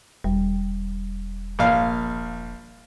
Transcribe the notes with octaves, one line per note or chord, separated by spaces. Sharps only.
E1 G3
A#1 F5